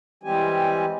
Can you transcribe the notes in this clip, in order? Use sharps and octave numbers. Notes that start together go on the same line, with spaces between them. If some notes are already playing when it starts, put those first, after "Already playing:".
E3 G3 G#3 C4 G4 G#5